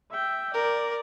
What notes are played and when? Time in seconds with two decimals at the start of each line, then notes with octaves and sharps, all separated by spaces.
0.11 E5 G5
0.54 A#4 D5